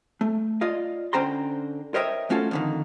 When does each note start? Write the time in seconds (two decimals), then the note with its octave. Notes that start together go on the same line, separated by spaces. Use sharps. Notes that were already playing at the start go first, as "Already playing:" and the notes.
0.21 A3
0.61 F4 D5 D#5 F5
1.13 D3 C#4 C5 G5 A#5 C6
1.94 A#4 C5 C#5 D#5 E5 G5
2.30 A3 C#4 F4 F#4 A4
2.51 F2 D3 D#3